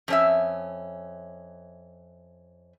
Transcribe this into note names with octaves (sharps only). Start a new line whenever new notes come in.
F2 C#4 E5